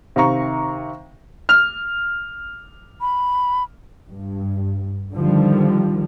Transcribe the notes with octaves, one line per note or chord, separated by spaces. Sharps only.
C3 D#3 F5 A#5 C#6
F6
B5
G2
D3 D#3 F3 G3